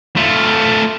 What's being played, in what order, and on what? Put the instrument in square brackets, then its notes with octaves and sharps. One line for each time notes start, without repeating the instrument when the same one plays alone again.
[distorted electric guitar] A3 F4